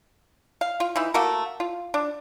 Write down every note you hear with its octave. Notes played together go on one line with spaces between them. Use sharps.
F5
F4
E3 D#4 E4
A3 A#3 F#4 A#4
F4
D4